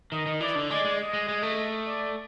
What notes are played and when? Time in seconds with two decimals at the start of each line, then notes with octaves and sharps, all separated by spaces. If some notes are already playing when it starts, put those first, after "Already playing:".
0.12 D#3 D#5
0.26 D#3
0.41 E3 D5
0.55 D3
0.70 G#3 D5
0.84 G#3
0.99 D#5
1.13 G#3
1.28 G#3
1.42 A3
1.87 D5